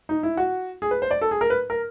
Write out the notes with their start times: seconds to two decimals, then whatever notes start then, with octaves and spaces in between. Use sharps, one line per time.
0.09 D#4
0.23 E4
0.37 F#4
0.82 G#4
0.91 B4
1.02 C5
1.11 D5
1.21 A4
1.31 G#4
1.41 A#4
1.50 B4
1.70 A#4